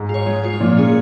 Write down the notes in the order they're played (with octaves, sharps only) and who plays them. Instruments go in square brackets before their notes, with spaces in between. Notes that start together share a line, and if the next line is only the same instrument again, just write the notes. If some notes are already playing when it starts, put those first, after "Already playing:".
Already playing: [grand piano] G#2
[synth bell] F4
C#5
G#3
F4 C#5
[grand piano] A#2 [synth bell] F3
[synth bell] C#4 G#4